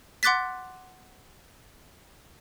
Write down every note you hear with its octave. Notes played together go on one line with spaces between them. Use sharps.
F#5 C6 D6 F#6 A6 B6